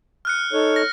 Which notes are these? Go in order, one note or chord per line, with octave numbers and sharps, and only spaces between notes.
F6 F#6 C#7
D#4 A4 C#5
A#6